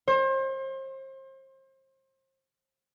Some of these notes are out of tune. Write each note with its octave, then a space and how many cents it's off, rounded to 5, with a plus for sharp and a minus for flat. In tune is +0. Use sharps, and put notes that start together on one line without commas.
C5 +35